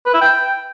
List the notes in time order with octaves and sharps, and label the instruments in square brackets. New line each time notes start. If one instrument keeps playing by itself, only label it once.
[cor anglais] B4
E4
G5